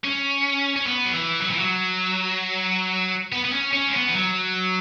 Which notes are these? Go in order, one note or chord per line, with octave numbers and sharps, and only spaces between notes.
C#4
C#4
B3
F#3
E3
F#3
E3
F#3
B3
B3
C#4
C#4
G#3
B3
E3
F#3